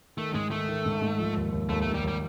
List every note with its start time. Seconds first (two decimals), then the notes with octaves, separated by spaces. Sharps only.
0.17 D#3 A3
0.34 G#2 G#3
0.51 D#3 A3
0.69 D#3
0.85 G#2
1.02 G#2
1.18 F3
1.36 D#2
1.52 D#2
1.69 D#2 A3
1.82 A3
1.86 D#2
1.94 G3
2.03 D#2
2.08 G3